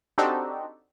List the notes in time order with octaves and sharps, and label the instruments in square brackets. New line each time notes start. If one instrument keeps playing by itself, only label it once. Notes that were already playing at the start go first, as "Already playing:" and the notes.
[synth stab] C4 D4 D#4 F#4 G4 A4